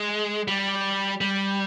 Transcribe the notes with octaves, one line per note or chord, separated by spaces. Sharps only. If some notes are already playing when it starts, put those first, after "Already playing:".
Already playing: G#3
G3
G3